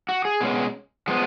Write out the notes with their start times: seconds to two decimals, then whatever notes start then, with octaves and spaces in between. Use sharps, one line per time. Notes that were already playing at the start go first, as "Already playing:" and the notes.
0.09 F#4
0.25 G#4
0.41 B2 G#3 C#4
1.08 F3 G#3 B3